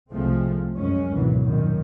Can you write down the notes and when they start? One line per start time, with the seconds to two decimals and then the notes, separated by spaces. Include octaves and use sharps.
0.11 C2 F3 G#3 A3 C4
0.76 F#2 G#3 C#4
1.12 G#1 D2 B2 E3 F#3
1.44 A#1 F#2 A#2 D#3